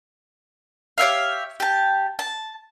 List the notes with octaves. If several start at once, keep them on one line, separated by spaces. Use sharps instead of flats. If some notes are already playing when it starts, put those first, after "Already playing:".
G4 C#5 E5 F5
G4 A5
A5